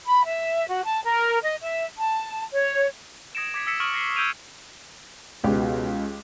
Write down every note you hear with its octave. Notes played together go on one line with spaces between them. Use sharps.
B5
E5
F#4
A5
A#4
D#5
E5
A5
C#5
D#6 G#6 A#6 C#7 D7 E7
D6 G#6 B6 C#7
E6 A#6 B6 C#7 E7
C#6 D#6 F6 A6 D7 F#7
A#6 C7 G7
E6 G6 G#6 D7 D#7 F7
C#2 B2 G#3 G4